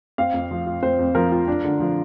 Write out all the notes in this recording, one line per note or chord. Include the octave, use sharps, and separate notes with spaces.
C4 F5
F2
F3
F4
C4 C5
F2
F3 A#4
F4
D4
D3
F3